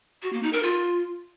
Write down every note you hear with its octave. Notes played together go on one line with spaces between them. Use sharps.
F#4
A#3
D#4
A#4
F4